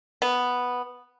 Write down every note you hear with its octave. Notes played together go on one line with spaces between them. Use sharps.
B3